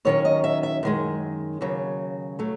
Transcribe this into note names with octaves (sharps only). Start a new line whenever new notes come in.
D#2 D#3 F#3 C#4 C#5
D#5
E5
E5
F#2 D#3 G#3
D#2 C#3 F#3
F#3 A3